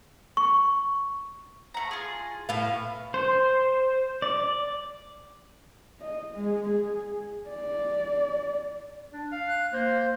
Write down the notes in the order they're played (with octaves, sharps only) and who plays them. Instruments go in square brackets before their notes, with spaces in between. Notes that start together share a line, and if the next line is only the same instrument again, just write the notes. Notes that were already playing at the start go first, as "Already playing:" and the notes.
[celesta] C#6
[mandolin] A3 A#5
F4 G#4
[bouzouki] A2 F5 [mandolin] B3
[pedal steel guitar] C5
D5
[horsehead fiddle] D#5
G#3
G#4
D5
[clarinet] D4
F5
[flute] F#6
[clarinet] A#3 [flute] C5